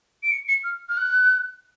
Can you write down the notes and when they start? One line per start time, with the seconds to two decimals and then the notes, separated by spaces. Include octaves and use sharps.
0.23 D7
0.31 C#7
0.48 C#7
0.64 F6
0.89 F6
0.97 F#6